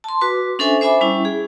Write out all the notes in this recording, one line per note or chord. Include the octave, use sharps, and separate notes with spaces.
A5 C6
F#4 B4 D6
C#4 D4 A4 C5 E5 G#5
C5 E5 G#5 B5 D6
G3 C#4 E4
G#4